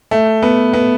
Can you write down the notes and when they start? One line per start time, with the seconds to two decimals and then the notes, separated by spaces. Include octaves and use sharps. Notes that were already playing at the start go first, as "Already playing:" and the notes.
0.11 A3
0.42 B3
0.73 B3